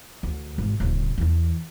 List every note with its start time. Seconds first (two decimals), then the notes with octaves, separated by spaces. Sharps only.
0.23 D2
0.58 G#1
0.80 D1 C#3
1.18 E2 E3